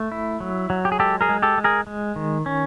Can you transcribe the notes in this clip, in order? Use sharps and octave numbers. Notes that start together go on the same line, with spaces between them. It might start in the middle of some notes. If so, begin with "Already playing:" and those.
Already playing: A3
E4
F#3
F#3
G4
G#4
G#3 G4 A4
G#4 A#4
G#3
G4 A4
G#3
G#4 A#4
G#3
D#3
C#4